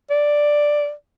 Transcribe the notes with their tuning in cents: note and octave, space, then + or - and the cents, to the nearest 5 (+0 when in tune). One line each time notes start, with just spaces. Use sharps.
D5 +5